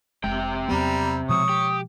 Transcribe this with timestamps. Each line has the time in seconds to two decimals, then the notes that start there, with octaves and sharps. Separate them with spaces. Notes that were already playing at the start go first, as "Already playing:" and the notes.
0.24 F1 C3 G#3 G5
0.69 E2 F#3 G3 B3 A#5
1.29 B2 F3 G#3 C#5 D#6
1.49 G4